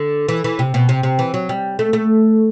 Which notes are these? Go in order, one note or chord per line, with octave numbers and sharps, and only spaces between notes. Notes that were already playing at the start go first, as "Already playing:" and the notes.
Already playing: D3
E3
E3
C3
B2
C3
C3
E3
F#3
G3
A3
A3